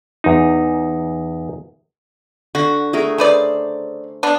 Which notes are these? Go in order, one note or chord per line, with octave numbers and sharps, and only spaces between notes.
E2 D#4
D3 F#4
A3 G#4 A#4
C#3 B4 C5 D5
B3 D4